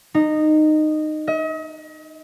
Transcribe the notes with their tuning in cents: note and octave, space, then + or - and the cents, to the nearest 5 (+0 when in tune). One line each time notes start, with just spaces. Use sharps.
D#4 -15
D#5 +40